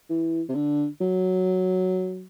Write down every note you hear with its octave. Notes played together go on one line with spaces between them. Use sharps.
E3
C3
D3
F#3